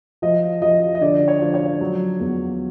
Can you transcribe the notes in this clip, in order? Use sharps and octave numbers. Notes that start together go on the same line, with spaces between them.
F3 D#5
F3 D#5
D#5
D3 D5
C#5
F3
C#5
F#3
E2